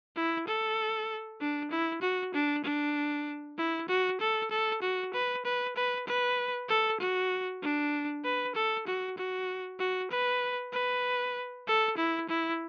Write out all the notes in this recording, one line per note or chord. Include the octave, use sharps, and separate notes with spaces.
E4
A4
D4
E4
F#4
D4
D4
E4
F#4
A4
A4
F#4
B4
B4
B4
B4
A4
F#4
D4
B4
A4
F#4
F#4
F#4
B4
B4
A4
E4
E4